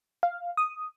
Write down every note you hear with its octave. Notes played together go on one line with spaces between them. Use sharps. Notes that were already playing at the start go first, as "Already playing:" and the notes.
F5
D#6